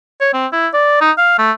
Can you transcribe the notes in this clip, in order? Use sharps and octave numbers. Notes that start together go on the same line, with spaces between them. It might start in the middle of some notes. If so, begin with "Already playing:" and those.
C#5
C4
E4
D5
D#4
F5
A3